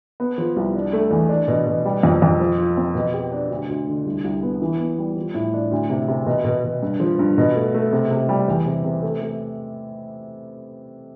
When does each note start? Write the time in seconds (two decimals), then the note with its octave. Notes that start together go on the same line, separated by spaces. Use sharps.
0.20 B3
0.38 F3
0.56 C2
0.75 D4
0.93 A3
1.11 E2
1.29 D4
1.48 B2
1.67 B2
1.85 G3
2.03 F2
2.22 F2
2.40 F3
2.58 F4
2.77 C4
2.95 B2
3.14 G4
3.32 D4
3.50 D2
3.69 D2
3.88 D3
4.06 C2
4.24 C2
4.43 B3
4.62 E3
4.80 B3
4.98 G3
5.16 F3
5.34 A2
5.54 D4
5.71 D2
5.90 C3
6.08 C3
6.26 B2
6.45 B2
6.64 B2
6.83 G2
7.00 F3
7.19 G2
7.38 B2
7.56 A3
7.74 A3
7.93 C3
8.11 C3
8.29 G3
8.48 E2
8.66 C3
8.84 C3
9.03 A3
9.21 A3